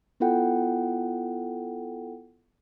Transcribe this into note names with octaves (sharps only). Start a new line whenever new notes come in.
B3 E4 F4 A4 F#5 G5